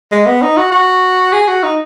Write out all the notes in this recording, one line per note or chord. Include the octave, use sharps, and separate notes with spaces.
G#3
B3
D#4
F#4
F#4
G#4
F#4
D#4